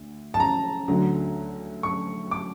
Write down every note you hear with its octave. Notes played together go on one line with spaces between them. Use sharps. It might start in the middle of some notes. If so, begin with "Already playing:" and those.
Already playing: D2
A5
A#5
D2 D3 F#3
C#6
D6